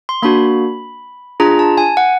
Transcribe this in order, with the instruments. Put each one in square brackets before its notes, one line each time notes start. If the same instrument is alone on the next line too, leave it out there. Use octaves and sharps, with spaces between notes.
[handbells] C6
A#3 D4 F#4 B5
D4 F4 G#4 A#5
A5
G#5
F#5